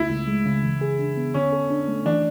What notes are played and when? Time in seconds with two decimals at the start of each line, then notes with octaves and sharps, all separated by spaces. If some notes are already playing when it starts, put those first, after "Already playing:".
Already playing: C#2 A3 E4
0.10 C#2
0.27 G#3
0.46 C#3
0.63 E3
0.81 G#4
0.99 D4
1.17 B3
1.34 D3 C#4
1.52 A4
1.70 D4
1.88 A3
2.06 E3 D4